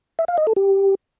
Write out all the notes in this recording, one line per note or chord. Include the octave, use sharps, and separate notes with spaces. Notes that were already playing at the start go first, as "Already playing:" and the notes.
E5
F5
D#5
A4
G4